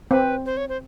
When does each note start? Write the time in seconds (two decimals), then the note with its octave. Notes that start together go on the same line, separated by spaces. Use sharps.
0.11 C4 B4
0.46 C5
0.57 C#5
0.69 C5